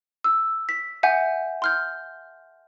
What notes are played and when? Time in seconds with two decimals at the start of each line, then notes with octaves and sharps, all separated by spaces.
0.24 E6
0.69 B6
1.03 E5 F#5 G#5 G6
1.62 C6 F6 G6